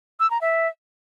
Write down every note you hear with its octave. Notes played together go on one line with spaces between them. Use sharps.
E6
A#5
E5